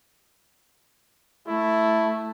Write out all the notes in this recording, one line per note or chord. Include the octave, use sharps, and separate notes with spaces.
A3 E4